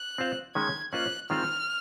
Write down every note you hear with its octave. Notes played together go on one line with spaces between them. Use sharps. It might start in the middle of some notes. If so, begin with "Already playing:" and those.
Already playing: F#6
C4 F4 C5 F5
D#3 G#3 C#4 G#6
A#3 C#4 F4 C5 D#5 F#6
D#3 G#3 C4 F4 C5 F6